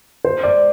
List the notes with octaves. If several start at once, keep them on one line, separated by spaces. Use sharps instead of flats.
C5
D5